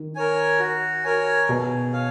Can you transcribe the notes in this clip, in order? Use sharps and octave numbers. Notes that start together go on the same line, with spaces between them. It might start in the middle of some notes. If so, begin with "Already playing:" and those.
Already playing: D#3
A#4 C#5 G#5
F#4
A#4 C#5 G#5
B2 G#4
C#5 F5 G#5